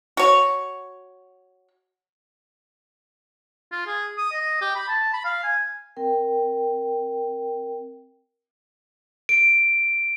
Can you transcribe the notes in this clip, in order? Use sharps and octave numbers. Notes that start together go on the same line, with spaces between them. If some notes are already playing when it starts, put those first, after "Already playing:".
F#4 C#5
F4
G#4
D#6
D#5
G4
B5
A5
B5
F5
G#5
C4 A#4 G5
D7